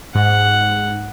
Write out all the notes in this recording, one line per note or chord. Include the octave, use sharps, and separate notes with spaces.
G#2 F#5